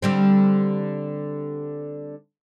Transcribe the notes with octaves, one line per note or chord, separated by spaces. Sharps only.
D3 G3 C4